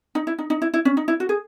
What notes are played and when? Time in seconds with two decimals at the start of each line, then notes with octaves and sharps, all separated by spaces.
0.15 D#4
0.27 E4
0.39 D#4
0.50 D#4
0.62 E4
0.74 E4
0.85 C#4
0.97 D#4
1.08 E4
1.20 F#4
1.29 G#4